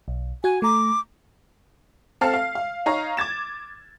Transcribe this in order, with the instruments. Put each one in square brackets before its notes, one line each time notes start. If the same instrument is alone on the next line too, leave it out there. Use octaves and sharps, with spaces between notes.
[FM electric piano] B1
[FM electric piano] F#4 F#5 G#6 [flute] G#5
[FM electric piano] A3 A#5 [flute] D6
[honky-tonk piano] C4 A4 F5 A5 F6
F5
F5
D#4 C#5 F5 A#5
D6 G#6 A6 E7